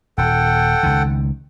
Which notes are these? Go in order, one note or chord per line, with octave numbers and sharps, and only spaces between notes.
D#1 A4 F#5 G5
C#2 D#3